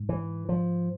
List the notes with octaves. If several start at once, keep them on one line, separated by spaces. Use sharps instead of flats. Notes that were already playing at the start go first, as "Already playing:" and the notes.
Already playing: G#2
E3
F3